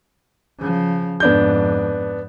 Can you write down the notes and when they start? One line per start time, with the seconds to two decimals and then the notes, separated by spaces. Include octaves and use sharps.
0.59 C#3 F3
1.20 F2 G#2 B3 D4 G6